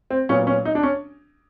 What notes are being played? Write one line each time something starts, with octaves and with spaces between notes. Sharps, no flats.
C4
A#2 F#3 B3 C#4
C#4
D#4
D4
C#4